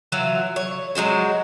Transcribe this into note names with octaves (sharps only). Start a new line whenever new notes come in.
E3 F#3 F4
C#5
F#3 G#3 F#4 C5